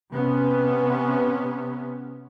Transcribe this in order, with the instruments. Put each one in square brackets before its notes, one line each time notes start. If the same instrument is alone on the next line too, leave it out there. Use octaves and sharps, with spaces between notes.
[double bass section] C3 B3 C#4